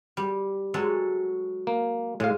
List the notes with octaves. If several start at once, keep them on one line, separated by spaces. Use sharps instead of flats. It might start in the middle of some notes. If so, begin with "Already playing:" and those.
G3
F#3 G#3 A4
A#3
A2 G#3 F5